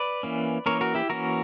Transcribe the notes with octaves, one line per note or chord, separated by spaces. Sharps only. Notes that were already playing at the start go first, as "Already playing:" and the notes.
Already playing: B4 D5
E3 A#3 C#4
E3 A#3 C#4 A#4 C#5
F#4 A#4
E4 G4
E3 A#3 C#4 F#4 A#4